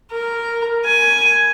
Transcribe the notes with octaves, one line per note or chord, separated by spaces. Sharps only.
A#4
G#5